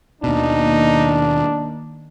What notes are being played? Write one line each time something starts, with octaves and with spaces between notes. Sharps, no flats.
D#2 B2 D#3 A#3 D4 D#4